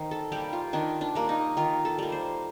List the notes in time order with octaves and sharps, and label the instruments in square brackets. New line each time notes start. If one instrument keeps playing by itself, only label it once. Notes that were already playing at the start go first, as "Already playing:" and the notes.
Already playing: [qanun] D#3 C5
A4
G3 A#3 G4
F4
D#3 D4
D4
G3 A#3
D#4
D#3 F4
A4
G3 A#3
C5